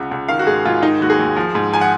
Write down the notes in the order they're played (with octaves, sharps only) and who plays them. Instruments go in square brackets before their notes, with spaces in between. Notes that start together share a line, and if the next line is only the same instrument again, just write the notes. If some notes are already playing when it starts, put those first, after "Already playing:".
Already playing: [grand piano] C#2 C#3 F#5
C#2
D#3 F5
F#4
G#2 G#4
G#2 F4
D#3 D#4
D#2 F#4
G#4
D#2
F3
G#2
F3 G#5
F#5